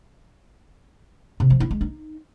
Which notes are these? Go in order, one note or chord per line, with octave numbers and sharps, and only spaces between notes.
C3
F3
E4
G#3
D#4